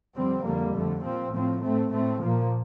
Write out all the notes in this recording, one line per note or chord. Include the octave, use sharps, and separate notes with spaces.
F2 D3 G3 C4
F2 D3 G3 A#3
F2 D3 A3
A#2 F3 C4
A2 F3 C4
A2 A3 C4
A2 A3 C4
A#2 F3 A#3